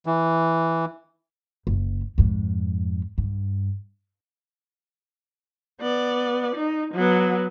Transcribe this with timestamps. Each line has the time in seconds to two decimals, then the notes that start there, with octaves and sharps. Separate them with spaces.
0.06 E3
1.67 F#1
2.18 F2 G#2
3.18 G2
5.81 B3 D5
6.56 D#4
6.94 F#3 B3